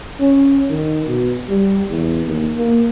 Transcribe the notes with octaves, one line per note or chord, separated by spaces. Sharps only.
C#4
D#3
B2
G3
E2
D#2
A#3